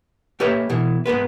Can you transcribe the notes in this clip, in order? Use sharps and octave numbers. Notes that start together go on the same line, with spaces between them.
A3 A#3 G4 B4 C#5 D#5
B2 E3
G#2 G#3 B3 B4